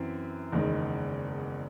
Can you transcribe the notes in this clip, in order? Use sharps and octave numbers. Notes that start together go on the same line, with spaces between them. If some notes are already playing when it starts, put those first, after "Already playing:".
Already playing: F#2 E3 C4 E4
F#1 E2 D#3 G#3